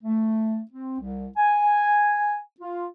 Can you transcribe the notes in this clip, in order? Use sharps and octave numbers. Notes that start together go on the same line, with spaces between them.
A3
C4
C2
G#5
F4